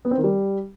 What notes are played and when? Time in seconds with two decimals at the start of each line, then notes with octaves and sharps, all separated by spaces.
0.05 B3
0.11 C4
0.17 D#3
0.24 G3